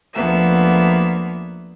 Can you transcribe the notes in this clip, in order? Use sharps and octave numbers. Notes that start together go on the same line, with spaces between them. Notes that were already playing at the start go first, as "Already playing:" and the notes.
D2 F3 A#3 B3 E5